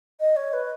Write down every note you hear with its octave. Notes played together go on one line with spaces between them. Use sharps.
D#5
C#5
B4